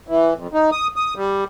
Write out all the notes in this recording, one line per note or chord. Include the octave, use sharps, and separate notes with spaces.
E3
F2
D#4
D#6
D#6
G3